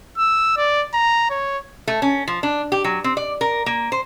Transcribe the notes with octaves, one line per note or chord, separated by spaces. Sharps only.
E6
D5
A#5
C#5
A3
C#4
F3
D4
G4
F#3
C4
D5
A#4
A#3
C5